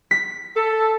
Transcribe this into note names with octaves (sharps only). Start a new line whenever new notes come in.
B6
A4